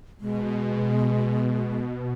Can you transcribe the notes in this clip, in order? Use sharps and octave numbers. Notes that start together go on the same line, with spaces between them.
B2 G#3